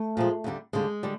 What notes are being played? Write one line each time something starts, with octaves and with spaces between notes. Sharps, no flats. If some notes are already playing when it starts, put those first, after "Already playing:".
Already playing: A3
A#2 F3 G#3
D#2 D3 G3
D#2 D3 G3 G#3
D3 G3